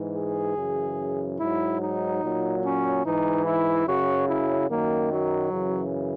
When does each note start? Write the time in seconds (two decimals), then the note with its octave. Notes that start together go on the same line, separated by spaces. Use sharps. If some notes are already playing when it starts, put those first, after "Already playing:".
Already playing: G#2 E3
0.15 G#4
0.56 F#2 C#3 E3
1.39 G#2 F#3 E4
1.81 D#4
2.21 A#2 F#3
2.63 C#4
3.04 G#2 E3 D#4
3.45 E4
3.86 F#2 C#3 F#3 F#4
4.28 E4
4.70 F#2 D#3 F#3 A#3
5.11 F#3
5.52 F#2 C#3 E3